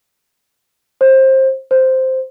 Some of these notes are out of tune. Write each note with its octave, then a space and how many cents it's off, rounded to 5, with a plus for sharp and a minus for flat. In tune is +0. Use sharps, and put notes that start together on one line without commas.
C5 +20
C5 -5